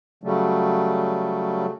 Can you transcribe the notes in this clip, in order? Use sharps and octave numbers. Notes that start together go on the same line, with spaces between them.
C#3 F#3 G3 A3